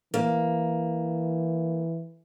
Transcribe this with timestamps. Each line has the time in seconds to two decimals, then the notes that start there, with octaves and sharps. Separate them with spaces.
0.14 E3 A#3